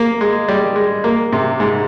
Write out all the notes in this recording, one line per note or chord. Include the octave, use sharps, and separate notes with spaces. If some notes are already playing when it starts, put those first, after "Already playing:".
Already playing: A#3
G#3
G3
G#3
A#3
C3
G#2